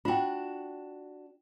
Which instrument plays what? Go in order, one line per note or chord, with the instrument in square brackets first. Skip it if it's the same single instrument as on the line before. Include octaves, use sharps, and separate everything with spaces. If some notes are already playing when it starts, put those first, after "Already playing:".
[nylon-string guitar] D4 F#4 [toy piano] F4 G5